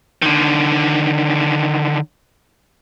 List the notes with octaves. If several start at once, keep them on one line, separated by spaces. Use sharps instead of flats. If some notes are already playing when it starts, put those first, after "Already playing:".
D3 D#3